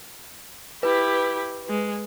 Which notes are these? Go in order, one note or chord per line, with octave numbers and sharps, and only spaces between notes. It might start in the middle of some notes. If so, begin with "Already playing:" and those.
E4 G4 B4
G#3